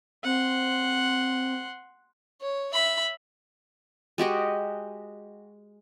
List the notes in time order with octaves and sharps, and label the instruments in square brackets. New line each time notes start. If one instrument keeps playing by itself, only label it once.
[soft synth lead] C4 [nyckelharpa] F#5 C6
[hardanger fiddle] C#5
E5 B5
[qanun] G#3 F#4 G4 D#5